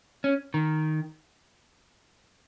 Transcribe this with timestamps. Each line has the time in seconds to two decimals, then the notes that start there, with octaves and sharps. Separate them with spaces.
0.24 C#4
0.54 D#3